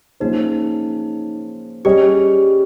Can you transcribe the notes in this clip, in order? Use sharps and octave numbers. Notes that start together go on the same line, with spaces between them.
F3 A#3 C#4 D#4 G#4 C5
G3 C#4 G4 G#4 D#5